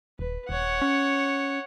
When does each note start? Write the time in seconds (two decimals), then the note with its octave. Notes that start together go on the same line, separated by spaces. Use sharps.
0.19 D#1 B4
0.49 D#1 C#5 F#5
0.82 C#4